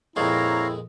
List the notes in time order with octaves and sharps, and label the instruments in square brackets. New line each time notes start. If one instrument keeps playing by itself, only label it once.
[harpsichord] F2 A#2 G#3 [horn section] C4 A#5 [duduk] E4 [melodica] C#5 F5